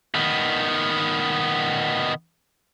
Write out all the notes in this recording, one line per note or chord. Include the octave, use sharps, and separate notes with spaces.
D#3 B3